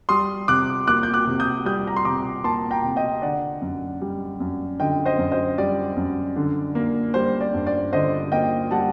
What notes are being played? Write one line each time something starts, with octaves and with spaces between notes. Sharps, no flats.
G3 C6 D#6
C3 D6 F#6
A#3 D6 F#6
G6
D6 F#6
C3
D#6 G6
G3 D#6 G6
A#5
C6
C3 A#5 D6
A#3 A5 C6
G5 A#5
C3
D#5 G5
D3 D5 F#5
F#2
G3
F#2
D3 D#5 G5
C5 D#5
F#2
C5 D#5
G3 D5
F#2
D3
A#3
G3 C5
D5
G2
D5
D3 C5 D#5
A#3 D#5 G5
G3 F#5 A5